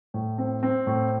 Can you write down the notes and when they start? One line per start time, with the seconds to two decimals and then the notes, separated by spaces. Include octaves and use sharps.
0.14 A2
0.38 C4
0.63 C4
0.87 A2